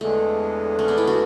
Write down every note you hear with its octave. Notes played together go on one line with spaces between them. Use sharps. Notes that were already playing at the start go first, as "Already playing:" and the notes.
E2 D3 G#3 A3
A3 C#4
B3 D4
C#4 E4
D4 F#4